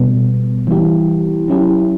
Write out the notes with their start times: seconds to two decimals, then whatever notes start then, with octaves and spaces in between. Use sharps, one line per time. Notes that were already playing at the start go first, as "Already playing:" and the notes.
Already playing: B2 G3 B3
0.67 E3 G3 B3 E4 G4
1.48 F#3 C#4 E4 G4